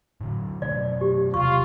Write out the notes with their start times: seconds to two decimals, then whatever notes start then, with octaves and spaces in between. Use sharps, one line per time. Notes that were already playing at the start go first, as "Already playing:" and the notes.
0.21 A2 D3 F#3
0.62 B2 F#3 A3 D5
1.01 G4
1.34 E1 C3 F4 C#6